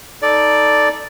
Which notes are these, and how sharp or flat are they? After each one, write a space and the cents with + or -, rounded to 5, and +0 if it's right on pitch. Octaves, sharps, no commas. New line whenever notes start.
D#4 +10 A4 +0 D5 +0